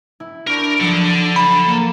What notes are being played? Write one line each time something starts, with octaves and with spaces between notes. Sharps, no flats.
E4
D4 A#4 B5 C#6 G6
F3 F#3 A4 F#5
B5
A#3